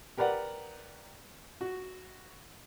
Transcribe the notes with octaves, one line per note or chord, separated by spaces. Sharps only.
G4 A#4 B4 D5 F#5
F#4